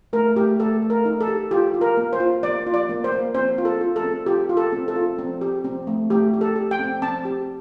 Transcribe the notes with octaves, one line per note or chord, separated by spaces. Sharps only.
A3 A#4
A3 G4
A3 A4
A3
A#4
D#4
A4
G4
F4 G4
F4
A#4
A#3
C5
F4
A#3 D5
F4
D5
A#3
C5
A#3
C4 C5
F4
A4
F4
A4
C4
F4 G4
F4
A4
C4
A4
F4
C4
G4
C4
A3
A3 G4
G4
A4
G4
G5
C4
C4 A5
G4